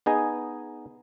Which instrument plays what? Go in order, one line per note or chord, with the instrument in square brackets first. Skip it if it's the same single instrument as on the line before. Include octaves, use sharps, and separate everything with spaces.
[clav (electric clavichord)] B3 D#4 G#4 D#5 G#5